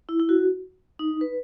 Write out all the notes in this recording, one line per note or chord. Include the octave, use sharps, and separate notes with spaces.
E4
E4
F#4
D#4
B4